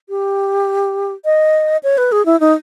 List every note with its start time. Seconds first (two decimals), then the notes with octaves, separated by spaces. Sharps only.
0.09 G4
1.25 D#5
1.83 C#5
1.98 B4
2.12 G#4
2.26 E4
2.40 D#4